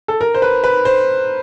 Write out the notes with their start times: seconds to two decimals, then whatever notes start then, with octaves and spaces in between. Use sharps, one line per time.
0.08 A4
0.21 A#4
0.34 C5
0.42 B4
0.64 B4
0.85 C5